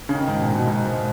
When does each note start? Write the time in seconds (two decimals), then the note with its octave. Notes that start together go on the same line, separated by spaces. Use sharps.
0.09 C#3
0.15 D#3
0.27 G#2
0.37 B2
0.41 A#2
0.55 B2
0.67 G#2
0.85 G#2